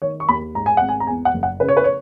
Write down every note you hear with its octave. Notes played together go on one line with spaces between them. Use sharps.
D#3 C#5
C#6
D#2 B5
G#2 A#5
G#5
G#1 F#5
G#5
A#5
E2 G#5
F#5
F#1
F#5
C#3 B4
C#5
B4
C#5